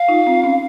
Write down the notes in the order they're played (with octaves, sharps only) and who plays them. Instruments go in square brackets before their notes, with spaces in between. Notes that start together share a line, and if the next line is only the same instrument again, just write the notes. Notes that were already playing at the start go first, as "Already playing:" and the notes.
Already playing: [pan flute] F5
[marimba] D#4 F4
C4
C#4